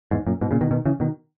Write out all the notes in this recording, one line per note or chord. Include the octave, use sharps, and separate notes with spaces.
E2 G#2
F#2 A#2
G#2 B2
A#2 C#3
B2 D#3
B2 D#3
C#3 E3
B2 D#3